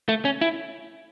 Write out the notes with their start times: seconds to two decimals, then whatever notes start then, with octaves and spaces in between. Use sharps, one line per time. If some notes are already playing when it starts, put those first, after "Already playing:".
0.09 A3
0.25 C#4
0.41 E4